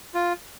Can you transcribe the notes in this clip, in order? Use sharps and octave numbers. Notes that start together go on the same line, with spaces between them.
F4